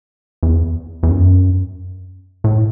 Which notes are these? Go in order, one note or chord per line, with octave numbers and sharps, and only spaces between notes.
E2
E2
F#2
A2